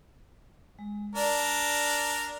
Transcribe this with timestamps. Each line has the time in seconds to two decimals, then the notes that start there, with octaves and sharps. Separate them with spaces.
0.79 G#3
1.15 D4 A#4 D5